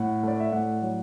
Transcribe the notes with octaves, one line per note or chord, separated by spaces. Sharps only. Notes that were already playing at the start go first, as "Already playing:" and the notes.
Already playing: A2 F#5
A3 D5
E5
A2 D5 F#5
F#3